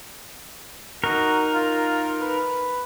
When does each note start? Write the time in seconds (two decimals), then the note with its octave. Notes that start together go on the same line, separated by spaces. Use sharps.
1.04 D#4 F#4 A#4
1.55 F4
2.21 B4